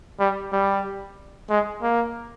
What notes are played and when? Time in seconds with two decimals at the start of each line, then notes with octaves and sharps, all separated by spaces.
0.20 G3
0.53 G3
1.50 G#3
1.82 A#3